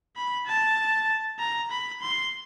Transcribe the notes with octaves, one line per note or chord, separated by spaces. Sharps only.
B5
A5
A#5
B5
C6